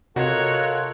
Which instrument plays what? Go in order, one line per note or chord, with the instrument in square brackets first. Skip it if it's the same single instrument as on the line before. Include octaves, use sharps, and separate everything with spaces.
[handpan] C3 D#5 [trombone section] F4 A4 A#4 [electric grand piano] F#4 [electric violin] C#5 F#6